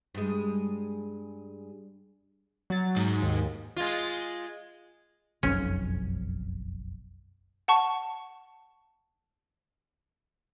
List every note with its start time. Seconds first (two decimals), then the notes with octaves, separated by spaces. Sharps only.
0.15 G2 G#3
2.70 F#3 A6
2.96 G#2
3.22 D#2
3.76 G#3 F4
5.43 F#1 B1 F2 C#4
7.68 F#5 A5 C#6